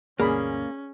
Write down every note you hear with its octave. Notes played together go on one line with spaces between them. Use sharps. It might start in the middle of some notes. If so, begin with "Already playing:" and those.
D2 G2 B2 A#3 C#4 G#4 D5 B5